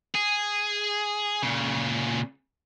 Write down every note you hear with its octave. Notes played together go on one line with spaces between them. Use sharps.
G#4
A#2 C#3